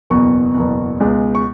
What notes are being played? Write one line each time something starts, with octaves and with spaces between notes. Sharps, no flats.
F#1 E2 B2 C#6
F#1 E2 B2
C#2 B2 G#3
C#6